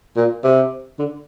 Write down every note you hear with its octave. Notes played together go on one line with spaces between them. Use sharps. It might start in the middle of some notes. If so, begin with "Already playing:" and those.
A#2
C3
D3